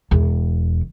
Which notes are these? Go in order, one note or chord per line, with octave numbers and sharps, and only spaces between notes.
E1 E2